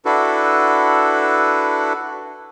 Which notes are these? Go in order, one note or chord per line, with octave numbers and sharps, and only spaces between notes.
D4 E4 F#4 A4 B4